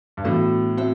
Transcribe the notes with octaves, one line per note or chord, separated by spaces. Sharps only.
G2
A2 E3 B3 D4 F#4 A4
A3 C4 F#4 C5 E5